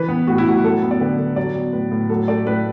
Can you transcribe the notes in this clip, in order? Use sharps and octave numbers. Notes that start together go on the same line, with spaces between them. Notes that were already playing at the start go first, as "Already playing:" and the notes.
Already playing: E3 B4
B3
A2 F#4
E4
A2 F#4
F#3 A4
B3
D5
D3 B4
D3
F#3 D5
B3
A2 B4
A2
F#3 A4
A3 D5
A2 B4